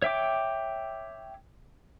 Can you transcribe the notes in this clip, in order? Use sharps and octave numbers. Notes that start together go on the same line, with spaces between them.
C#5 E5 G5 D6